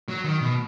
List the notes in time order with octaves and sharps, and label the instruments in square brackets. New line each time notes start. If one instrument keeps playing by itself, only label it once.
[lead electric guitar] F#3
D#3
B2